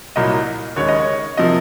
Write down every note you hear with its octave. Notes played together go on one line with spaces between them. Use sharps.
C2 A#2 F#3 A#3 D#5
D#2 C#3 G#3 C#5
D#5
C#5
C3 F3 A#3 D#5